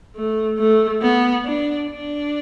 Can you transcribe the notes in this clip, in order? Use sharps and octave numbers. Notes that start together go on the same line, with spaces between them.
A3
A3
B3
D4
D4